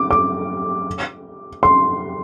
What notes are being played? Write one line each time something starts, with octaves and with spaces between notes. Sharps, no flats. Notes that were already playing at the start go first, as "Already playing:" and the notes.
Already playing: D6
D6
C6